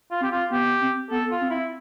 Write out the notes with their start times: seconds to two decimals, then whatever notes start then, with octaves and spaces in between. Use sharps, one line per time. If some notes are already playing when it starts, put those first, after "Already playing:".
0.11 F4
0.21 C4 G4
0.31 F4
0.51 B3 G4
0.81 C4
1.11 B3 A4
1.31 F4
1.41 C4
1.50 E4